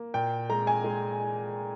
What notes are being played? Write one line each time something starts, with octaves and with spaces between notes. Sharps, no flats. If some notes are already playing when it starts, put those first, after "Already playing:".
Already playing: A#3
A#2 G5
G#3 A#5
G#5
G#3